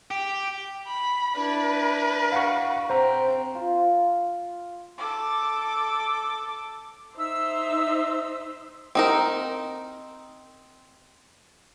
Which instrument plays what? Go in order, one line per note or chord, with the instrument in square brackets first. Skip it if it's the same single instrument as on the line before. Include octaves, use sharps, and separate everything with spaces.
[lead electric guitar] G4
[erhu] B5
[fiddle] D4 E4 [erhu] B4
[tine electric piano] F5 F#5 C#6
[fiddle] C4 [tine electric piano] C5 A#5
[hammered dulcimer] F4
[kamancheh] A4 D6
[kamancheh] D#4 C5 [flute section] E5 E6
[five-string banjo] C4 D#4 A#4